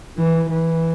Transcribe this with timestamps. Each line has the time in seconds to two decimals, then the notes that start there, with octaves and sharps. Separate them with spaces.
0.17 E3
0.49 E3